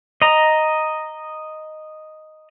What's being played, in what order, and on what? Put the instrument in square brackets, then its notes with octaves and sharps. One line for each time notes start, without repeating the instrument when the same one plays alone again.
[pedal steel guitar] D#5 A#5